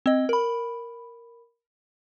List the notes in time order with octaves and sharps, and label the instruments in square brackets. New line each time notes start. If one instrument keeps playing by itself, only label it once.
[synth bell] C4 D#5
A#4 B5